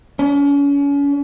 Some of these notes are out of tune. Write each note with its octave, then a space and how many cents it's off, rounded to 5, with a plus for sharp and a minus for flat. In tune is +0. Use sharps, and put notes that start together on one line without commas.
C#4 +35